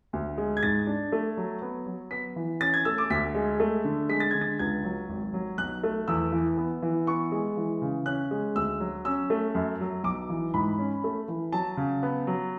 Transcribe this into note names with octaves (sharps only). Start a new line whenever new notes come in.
D2
G#3
G#6
G#2 A6
D4
A3
F#3
B3
F#3
B3 B6
E3
C#4 A6
G#6
A3 E6
D6
D2 B6
G#3
A3
D3
G#3 B6
A6
D3 G#6
A6
C#2 G#6
F#3
G#1
F#3
B1 F#6
A3
E2 E6
E3
B3
E3
B3 C#6
G#3
E3
C#3
C#4 F#6
G#3
D2 E6
F#3
C#4 E6
A3
F#2
F#3
B1 D6
E3
G#2 B5
C#4
A3
E3
F#3 A5
C#3
B3
F#3